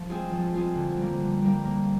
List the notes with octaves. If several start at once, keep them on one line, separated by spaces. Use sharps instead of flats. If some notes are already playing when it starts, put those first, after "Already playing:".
Already playing: F3
G#3 C4 F4 G#4
F3
G#3 C4 F4 G#4
D3
G3 A#3
D3
G3 A#3
A#3